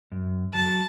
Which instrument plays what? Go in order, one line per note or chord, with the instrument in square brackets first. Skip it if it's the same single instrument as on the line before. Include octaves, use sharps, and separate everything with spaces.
[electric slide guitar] F#2
[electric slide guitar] F#3 [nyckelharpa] A5